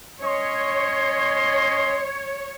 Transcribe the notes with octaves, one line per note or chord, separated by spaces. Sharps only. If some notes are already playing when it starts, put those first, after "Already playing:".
C#4 C#5 D#5 C6